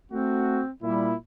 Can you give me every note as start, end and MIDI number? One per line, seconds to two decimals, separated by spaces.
0.12 0.61 57
0.12 0.70 60
0.12 0.61 66
0.82 1.13 46
0.82 1.12 55
0.82 1.13 64